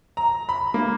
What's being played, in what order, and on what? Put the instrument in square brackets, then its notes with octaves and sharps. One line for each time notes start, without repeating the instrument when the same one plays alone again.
[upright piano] A#5
B5
A#3